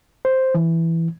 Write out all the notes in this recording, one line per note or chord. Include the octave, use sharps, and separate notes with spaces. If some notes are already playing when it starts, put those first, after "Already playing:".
C5
E3